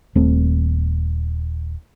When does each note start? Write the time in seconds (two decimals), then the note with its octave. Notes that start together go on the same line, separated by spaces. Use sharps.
0.15 D#1 A3 C4